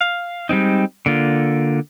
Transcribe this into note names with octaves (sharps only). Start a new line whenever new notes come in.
F5
G3 G#3 C4 D#4
D3 A#3 F4